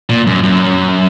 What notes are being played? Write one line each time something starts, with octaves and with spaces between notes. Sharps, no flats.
A#2
F#2
F#2